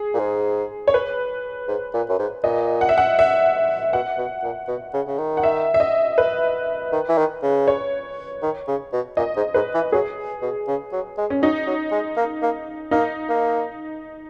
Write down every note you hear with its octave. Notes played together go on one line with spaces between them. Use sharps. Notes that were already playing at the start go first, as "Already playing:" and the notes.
Already playing: G#4
A#2
G#2
C#5
B4
G#2
A#2
F#2
G#2
A#2 D#5
F#5
E5
F#5
E5
B2 F#5
B2
A#2
B2
C#3
C#3
D#3
F#5
E5
E5
D#5
B4
D#3
E3
D#3
C#3
C#5
D#3
C#3
B2
A#2 D#5
G#2
G#2 B4
E3
F#3 G#4
B2
C#3
F#3
G#3
C#4
F#3 D#4
F#3
G#3
A#3
A#3
A#3 D#4
A#3